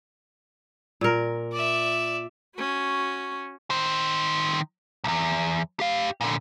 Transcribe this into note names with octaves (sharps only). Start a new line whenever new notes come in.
A#2 A#4
D5 E5
C#4 F#4
D#3 C5
B1 E2
G4 F5
A#2 D3